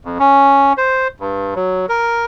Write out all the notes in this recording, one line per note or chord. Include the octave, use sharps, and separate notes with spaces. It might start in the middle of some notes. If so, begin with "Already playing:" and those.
F2
C#4
C5
G2
F#3
A#4